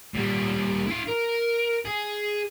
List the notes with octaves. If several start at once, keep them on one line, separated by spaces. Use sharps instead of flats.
A#2 G3
E4 F5
A#4
G#4